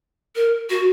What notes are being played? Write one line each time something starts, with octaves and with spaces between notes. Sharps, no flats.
A#4
F#4